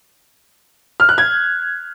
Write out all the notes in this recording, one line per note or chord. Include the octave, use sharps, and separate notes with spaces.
F6
F#6
G#6